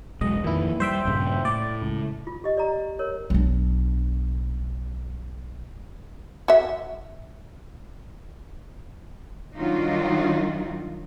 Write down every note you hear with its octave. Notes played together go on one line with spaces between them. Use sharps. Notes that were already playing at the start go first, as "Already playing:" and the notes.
E1 B1 G#3 D#5
F2 A#2 D#3 E3 E4
G3 C5 E5 G5
A#1 G2 C#3
A2 D5
C#2
F4
G4 D#5
D5 A#5
A#4 C#5
B1 D4
F#4 E5
D#3 F#3 G3 D4 D#4 F4